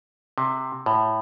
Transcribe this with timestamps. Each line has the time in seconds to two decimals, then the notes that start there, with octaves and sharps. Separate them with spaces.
0.38 C3
0.86 A2